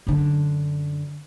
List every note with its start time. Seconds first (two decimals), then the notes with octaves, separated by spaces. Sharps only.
0.07 F#2 D3